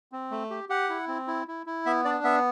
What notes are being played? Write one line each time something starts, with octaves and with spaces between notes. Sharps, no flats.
C4
A3
G4
G4 F#5
E4
C4
E4
E4
E4
B3 E5
D4 D5
B3 E5